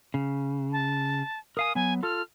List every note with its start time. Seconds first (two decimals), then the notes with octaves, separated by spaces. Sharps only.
0.14 C#3
0.72 A5
1.57 A#4 F5 G#5 D#6
1.75 F#3 B3 G#5
2.03 F4 A4 F6